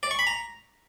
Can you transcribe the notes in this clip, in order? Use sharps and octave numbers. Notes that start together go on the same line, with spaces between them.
D5
C#6
B5
A#5